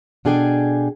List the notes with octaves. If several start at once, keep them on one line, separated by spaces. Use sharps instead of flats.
B2 D4 G#4 A4 G5 G#5